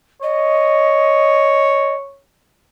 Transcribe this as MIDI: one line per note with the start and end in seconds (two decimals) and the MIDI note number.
0.22 2.23 73
0.22 1.94 75